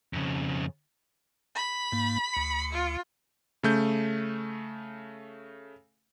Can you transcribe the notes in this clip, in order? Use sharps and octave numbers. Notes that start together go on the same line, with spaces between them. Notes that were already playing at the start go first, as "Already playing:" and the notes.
F2 C#3
B5
G#2 A#3
D2 C#7
F4
C#3 A3 G6